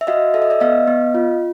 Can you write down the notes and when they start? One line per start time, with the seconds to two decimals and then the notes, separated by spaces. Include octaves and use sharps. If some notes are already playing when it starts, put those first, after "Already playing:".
0.01 E5
0.07 F#4 D#5 F5
0.34 A4 E5
0.42 D#5
0.50 D5 E5
0.60 B3 D#5 F5
0.88 B3
1.14 F4